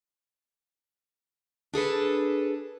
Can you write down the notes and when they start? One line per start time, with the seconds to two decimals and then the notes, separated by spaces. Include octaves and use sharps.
1.74 D4 G#4 A4 B4